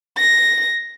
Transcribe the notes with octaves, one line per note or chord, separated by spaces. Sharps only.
A#6